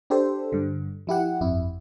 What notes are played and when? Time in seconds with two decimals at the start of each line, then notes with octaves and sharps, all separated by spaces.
0.10 D4 G4 A4 C5
0.52 G2 D3
1.07 F3 E4 G4 F#5
1.41 G1 F2 E4